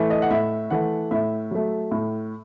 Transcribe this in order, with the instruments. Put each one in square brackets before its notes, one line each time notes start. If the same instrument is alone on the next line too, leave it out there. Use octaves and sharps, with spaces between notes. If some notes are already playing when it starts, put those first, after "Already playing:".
Already playing: [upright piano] E3 A3
D#5
F#5
A2 E5
E3 A3 F#5
A2 E5
F#3 A3
A2